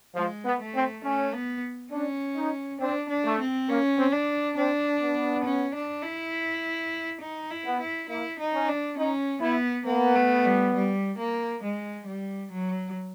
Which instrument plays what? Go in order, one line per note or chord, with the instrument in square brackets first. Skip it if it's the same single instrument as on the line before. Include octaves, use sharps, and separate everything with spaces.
[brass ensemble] F3 [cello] G#3
[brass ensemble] B3
[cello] A3
[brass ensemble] C4
[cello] A3 [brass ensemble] C#4
[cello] B3
[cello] C#4 [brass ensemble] D4
[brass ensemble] D#4
[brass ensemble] C4 [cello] D4
[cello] D4
[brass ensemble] A3
[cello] C4
[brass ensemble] A#3 [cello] C#4
[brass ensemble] C4
[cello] D4
[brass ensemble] C4 [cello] D4
[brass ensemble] B3
[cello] C#4
D4
E4
D#4
E4
[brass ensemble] B3
[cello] E4
[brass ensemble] A#3 [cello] E4
[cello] D#4
[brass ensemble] C#4
[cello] D4
[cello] C#4 [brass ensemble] D#4
[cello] B3 [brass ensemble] E4
[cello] A#3 [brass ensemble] B3
[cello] A3
G3
G3
A#3
G#3
G3
F#3